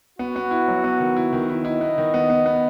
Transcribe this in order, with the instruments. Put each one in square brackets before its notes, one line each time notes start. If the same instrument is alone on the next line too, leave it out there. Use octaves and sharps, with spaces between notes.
[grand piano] B3 [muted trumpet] F#4
[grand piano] B3
E4
F#3
B3
D#3
E4
D#3
E4
[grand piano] E4 [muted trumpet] D#5
[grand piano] B3
D#3
B3
B3
B3